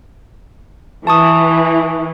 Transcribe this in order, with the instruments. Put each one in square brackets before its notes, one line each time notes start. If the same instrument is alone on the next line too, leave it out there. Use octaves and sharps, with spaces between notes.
[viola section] E3 [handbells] A5 C#6 D#6